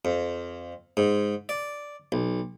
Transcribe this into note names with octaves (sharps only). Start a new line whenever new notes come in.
F2
G#2
D5
B1